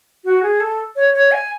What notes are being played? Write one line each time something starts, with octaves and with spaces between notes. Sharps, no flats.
F#4
G#4
A4
C#5
C#5
G#5